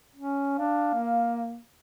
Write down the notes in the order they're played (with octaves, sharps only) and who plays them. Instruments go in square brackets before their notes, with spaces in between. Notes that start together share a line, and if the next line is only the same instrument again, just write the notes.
[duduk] C#4
[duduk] D4 [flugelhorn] F5
[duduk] A#3